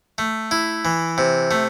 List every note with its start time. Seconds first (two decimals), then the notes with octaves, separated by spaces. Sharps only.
0.18 A3
0.51 E4
0.85 E3
1.18 C3
1.51 A3